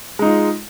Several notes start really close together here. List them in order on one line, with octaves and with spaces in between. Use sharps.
G#3 D#4 F4